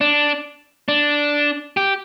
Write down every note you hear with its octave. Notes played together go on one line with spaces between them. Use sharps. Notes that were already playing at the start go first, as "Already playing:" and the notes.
D4
D4
G4